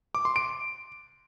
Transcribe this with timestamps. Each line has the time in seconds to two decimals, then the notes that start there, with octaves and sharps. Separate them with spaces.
0.15 D6
0.25 C6
0.36 D7